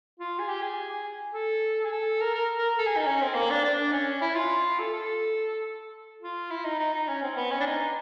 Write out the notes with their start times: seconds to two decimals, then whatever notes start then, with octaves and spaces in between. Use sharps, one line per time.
0.20 F4
0.39 G#4
0.48 G4
0.62 G#4
1.34 A4
1.85 G#4
1.92 A4
2.21 A#4
2.35 A#4
2.58 A#4
2.79 A4
2.87 G#4
2.97 D#4
3.06 C#4
3.22 C4
3.35 A#3
3.50 D4
3.64 D4
3.92 C#4
4.21 E4
4.35 F4
4.79 A4
4.94 A4
6.22 F4
6.50 E4
6.65 D#4
6.79 D#4
6.94 D#4
7.08 C#4
7.23 C4
7.37 B3
7.51 C#4
7.60 D4
7.66 D#4